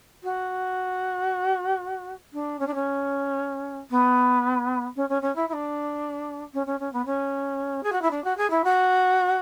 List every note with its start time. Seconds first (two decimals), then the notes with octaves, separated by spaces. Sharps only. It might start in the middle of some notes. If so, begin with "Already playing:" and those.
0.23 F#4
2.33 D4
2.59 C#4
2.67 D4
2.74 C#4
3.90 B3
4.96 C#4
5.09 C#4
5.22 C#4
5.35 E4
5.48 E4
5.53 D4
6.54 C#4
6.66 C#4
6.79 C#4
6.93 B3
7.05 C#4
7.83 G#4
7.92 F#4
8.02 E4
8.11 D4
8.24 F#4
8.37 G#4
8.50 E4
8.64 F#4